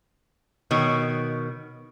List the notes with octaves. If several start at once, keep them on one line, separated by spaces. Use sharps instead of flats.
B2 D#3 C#5